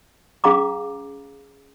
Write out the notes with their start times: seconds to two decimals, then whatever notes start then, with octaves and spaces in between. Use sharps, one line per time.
0.44 C#4 G#4 F5 A#5 D6